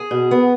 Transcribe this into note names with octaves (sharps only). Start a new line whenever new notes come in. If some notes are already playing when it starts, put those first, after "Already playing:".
Already playing: G#4
B2
B3